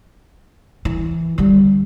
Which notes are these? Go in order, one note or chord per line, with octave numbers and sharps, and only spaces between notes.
E3
D3 G3